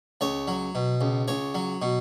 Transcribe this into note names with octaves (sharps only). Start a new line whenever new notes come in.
C#2 C#5
F#3
B2
C#2
C#2 C#5
F#3
B2